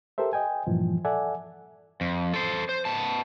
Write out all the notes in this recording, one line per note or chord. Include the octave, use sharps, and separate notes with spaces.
G4 A4 A#4 C5 E5
D#5 G5 G#5
G2 A#2 E3 F3
A4 D5 E5 F#5 G#5
F2
A4 C5
C5
B3 A5